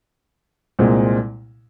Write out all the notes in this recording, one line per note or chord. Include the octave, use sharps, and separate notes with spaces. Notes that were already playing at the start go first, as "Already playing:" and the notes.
C2 A#2 G#3 C4